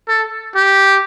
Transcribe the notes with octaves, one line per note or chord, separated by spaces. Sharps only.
A4
G4